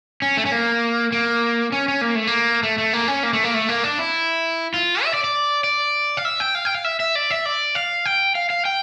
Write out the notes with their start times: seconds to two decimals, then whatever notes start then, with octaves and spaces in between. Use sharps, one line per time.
0.22 C#4
0.37 A3
0.45 C#4
0.52 A#3
1.12 A#3
1.72 C#4
1.88 C#4
2.01 A#3
2.15 A3
2.27 A#3
2.63 A3
2.78 A3
2.93 A#3
3.08 C#4
3.23 A#3
3.33 A3
3.44 A#3
3.54 A3
3.69 A#3
3.84 D4
3.99 E4
4.74 F4
5.04 E5
5.14 D5
5.24 D5
5.64 D5
6.17 F5
6.25 E5
6.40 G5
6.55 F5
6.65 G5
6.75 F5
6.84 E5
7.00 E5
7.15 D5
7.30 E5
7.46 D5
7.75 F5
8.05 G5
8.35 F5
8.50 F5
8.65 G5